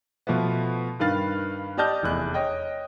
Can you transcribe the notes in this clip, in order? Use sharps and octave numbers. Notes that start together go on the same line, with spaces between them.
B2 F3 A3 B3
G2 D#3 B4 F5 A6
G4 D5 D#5 A5 F6 G6
F1 E2 F#6
C#5 D#5 G5